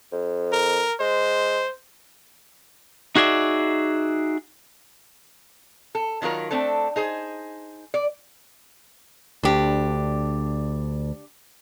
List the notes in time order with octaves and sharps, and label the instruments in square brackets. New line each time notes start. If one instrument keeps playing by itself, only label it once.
[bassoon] F2
[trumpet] A#4
[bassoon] G#3 [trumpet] C5
[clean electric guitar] D#4 F#4 G#4 D5 E5
[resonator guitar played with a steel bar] A4
D#3 F#3 F4 A#4
A3 C4 D4 A4
D#4 G#4 C5
D5
[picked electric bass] D2 [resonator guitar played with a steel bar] D4 G4